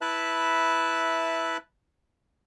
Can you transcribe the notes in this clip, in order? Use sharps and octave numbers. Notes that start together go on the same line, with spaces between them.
E4 B4 E5 A5 F#6